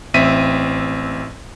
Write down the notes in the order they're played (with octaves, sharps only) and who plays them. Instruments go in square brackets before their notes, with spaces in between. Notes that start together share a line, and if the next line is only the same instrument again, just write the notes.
[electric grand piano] A1 C4 E5 B6 D#7